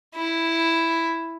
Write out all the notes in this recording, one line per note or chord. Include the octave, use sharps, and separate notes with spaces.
E4